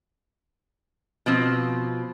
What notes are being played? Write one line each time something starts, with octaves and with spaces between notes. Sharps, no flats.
B2 F3 C4